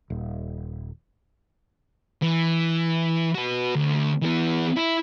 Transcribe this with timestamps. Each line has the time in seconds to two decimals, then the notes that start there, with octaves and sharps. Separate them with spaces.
0.10 D#1
2.22 E3
3.35 F#4 B4
3.75 D2
4.22 E3 B3
4.77 E4